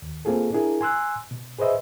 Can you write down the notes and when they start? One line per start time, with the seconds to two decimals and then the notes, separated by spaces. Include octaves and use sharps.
0.02 D#2
0.25 A#3 C4 F4 G#4 A4
0.53 D4 E4 G#4 A#4
0.81 G#5 C6 E6 F#6
1.31 B2
1.58 G#4 B4 C5 D#5 E5